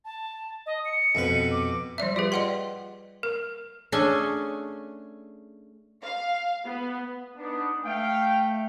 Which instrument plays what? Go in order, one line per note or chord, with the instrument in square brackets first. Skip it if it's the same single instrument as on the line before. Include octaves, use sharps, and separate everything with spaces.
[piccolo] A5
D#5
C#7
[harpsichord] F2 B2 B4
[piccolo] D6
[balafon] F3 G3 D5 E5
F4 G4 G#4 B4
D5 D#5 F#5 G5 C6
A#4
[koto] A3 C#4 D4 G#4 A4 G#5
[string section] F5
B3
[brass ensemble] B3 D4 [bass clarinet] D#4
[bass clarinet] A3 [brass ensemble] F5 G5